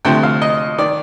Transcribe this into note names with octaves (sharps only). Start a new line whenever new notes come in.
D2 C3 F3 G5
F5
D#5
D#3 D5